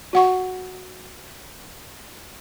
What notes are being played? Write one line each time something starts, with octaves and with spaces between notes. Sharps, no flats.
F#4 F#5 C#6